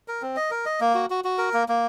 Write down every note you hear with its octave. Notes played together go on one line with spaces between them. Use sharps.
A#4
C4
D#5
A#4
D#5
A#3
F#4
F#4
F#4
A#4
A#3
A#3